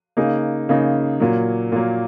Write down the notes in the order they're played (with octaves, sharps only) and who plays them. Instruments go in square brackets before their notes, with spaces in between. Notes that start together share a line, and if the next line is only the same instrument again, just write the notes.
[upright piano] C#3 A#3 D#4 G#4
C#3 A#3 D#4 G#4
A#2 F#3 A#3
A#2 F#3 A#3